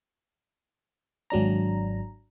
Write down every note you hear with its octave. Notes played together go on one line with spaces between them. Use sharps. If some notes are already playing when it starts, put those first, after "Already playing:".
G#1 F#3 D4 A#5